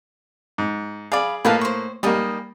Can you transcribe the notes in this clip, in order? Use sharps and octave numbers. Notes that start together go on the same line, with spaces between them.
G#2
G#4 D5 F5 B5
A2 A#3 D#4 F4 B4 A5
C5 C#6
G3 A#3 D#4 D#5 G#5